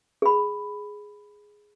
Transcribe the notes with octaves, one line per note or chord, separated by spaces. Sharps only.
G#4 B5